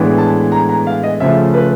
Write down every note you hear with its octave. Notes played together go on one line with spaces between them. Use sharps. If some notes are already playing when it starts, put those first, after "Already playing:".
Already playing: A2 E3 G#3 B3 D4
A5
A#5
A#5
F5
D#5
C#3 F3 A3 E5
B4